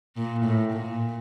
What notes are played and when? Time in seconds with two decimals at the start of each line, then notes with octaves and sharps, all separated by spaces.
0.16 A#2
0.45 A2
0.73 A#2